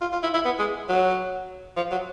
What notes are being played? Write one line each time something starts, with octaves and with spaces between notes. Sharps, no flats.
F4
F4
E4
E4
B3
G#3
F#3
F3
F#3